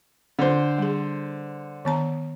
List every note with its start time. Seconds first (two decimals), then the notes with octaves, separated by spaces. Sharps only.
0.39 D3 C5
0.78 G3 G#4
1.85 D#3 B3 A#5